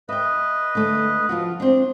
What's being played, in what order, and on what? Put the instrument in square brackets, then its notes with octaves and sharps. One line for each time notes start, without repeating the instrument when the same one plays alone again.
[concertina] B4 D#5 [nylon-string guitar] E5 G5
[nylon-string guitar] D3 A3
F3 F4 F#4
C4 D4